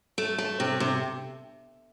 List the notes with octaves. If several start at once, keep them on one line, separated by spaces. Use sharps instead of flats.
A3
A3
C3
C3